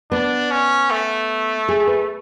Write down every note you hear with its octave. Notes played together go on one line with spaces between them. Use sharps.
B3 D4
C#4
A3
G#4
B4